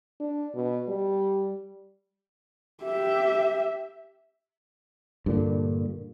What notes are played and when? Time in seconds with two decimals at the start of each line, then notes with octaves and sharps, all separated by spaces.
0.20 D4
0.55 B2
0.88 G3
2.84 G4 E5
5.26 G2 A#2 D3